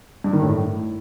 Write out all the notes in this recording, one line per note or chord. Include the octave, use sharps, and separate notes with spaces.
G2
D#3
A2